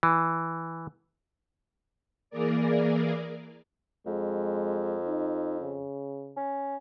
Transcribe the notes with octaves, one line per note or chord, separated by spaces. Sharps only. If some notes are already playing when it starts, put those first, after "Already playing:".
E3
E3 A#3 G#4 A#4 D5
F2 G#3
D#4
C#3
C#4